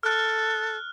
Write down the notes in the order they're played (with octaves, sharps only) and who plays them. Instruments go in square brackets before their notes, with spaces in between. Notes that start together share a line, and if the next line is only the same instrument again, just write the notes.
[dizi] A4 [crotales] F6 F#6